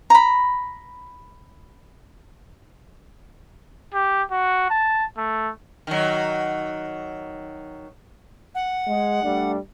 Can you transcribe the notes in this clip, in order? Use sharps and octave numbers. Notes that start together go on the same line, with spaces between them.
A#5 B5
G4
F#4
A5
A3
D#3 F#3
F#5
G#3
G3 A3 D4